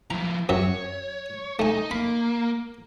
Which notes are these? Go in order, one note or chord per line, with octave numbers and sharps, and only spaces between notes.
F3 E4 A#5
F#2 F#3 C#5 E5
A3 D#4 G#5
A#3 B5